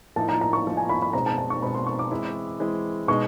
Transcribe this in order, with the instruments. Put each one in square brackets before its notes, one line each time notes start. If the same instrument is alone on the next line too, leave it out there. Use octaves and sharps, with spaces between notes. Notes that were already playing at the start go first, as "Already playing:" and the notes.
[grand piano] A2 F3 A#3 D#4 [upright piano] A5
[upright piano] A#5
A#5
C#6
[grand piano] A2 F3 A#3 D#4
[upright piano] G#5
B5
B5
[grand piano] B2 G#3 C4 [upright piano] A#5
[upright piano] A5
A5
C#6
[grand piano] B2 G#3 C4 [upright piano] B5
[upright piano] C6
C#6
D6
[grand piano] E3 G#3 C4 E4
E3 G#3 C4 E4
[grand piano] B2 G#3 B3 D#4 [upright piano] C#6